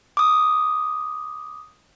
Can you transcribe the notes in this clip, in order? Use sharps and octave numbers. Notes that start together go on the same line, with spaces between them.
D6 D#6